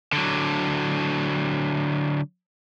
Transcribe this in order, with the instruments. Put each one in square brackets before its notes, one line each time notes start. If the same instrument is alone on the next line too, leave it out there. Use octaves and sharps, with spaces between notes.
[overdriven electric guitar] D3 F#3